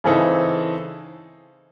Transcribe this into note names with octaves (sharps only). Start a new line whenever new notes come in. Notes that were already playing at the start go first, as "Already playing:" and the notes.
C#3 E3 C4 D#4 A4